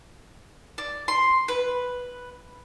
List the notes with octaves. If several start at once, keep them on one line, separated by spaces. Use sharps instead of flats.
D5
C6
B4